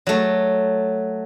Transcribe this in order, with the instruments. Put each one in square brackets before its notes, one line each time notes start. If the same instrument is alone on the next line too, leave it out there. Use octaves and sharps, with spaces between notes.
[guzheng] F#3 A3